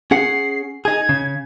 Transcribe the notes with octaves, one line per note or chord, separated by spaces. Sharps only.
C#4 G#4 F#5 C7
D#4 G#4 G#6
C#3